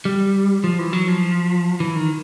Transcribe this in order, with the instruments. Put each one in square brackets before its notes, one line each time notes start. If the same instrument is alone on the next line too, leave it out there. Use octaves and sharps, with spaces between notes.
[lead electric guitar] G3
F3
E3
F#3
F3
E3
D#3